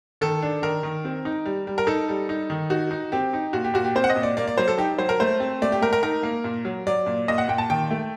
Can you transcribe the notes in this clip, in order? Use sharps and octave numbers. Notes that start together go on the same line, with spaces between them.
D#3 A4
D4
D#3 A#4
D#3
C4
D#4
G3
G3
A#4
D#4 A4
G3
D#4
D#3
D#4 F#4
D#4
C4 G4
D#4
A#2 F#4
G4
A#2 F#4
G4
C4 C5
F#5
D#5
A#2
D5
A#3 D5
D5
F#3 C5
A4
D#4 G4
F#3 C5
A#4
A3 C5
C4
A3 D5
G4
A3 A#4
A#4
D#4 A#4
A#3
A#2
F#3
F#3 D5
A#2
A#2 D#5
F#5
A#2 G5
A5
D#3 G5
A3